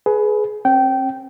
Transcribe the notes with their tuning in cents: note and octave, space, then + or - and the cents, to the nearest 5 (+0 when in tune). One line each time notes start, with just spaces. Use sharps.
G#4 +25 B4 +0
C4 +45 G5 -20